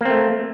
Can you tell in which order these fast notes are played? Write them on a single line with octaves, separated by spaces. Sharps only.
A#3 C4 A3